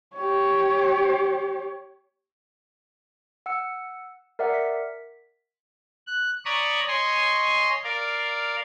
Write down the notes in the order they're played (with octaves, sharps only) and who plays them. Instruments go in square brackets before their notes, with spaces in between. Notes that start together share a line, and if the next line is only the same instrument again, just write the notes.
[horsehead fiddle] G4 C#5
[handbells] F#5 E6 C#7
A#4 D5 E5 F#5
B6
[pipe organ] F#6
C#5 D5 A#5 B5 C#6 D#6
C#5 D#5 G#5 C6
A#4 D5 F5